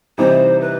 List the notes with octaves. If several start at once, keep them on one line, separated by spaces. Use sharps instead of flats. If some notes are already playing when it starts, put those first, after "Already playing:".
C3 E3 G3 D#4 C5
B4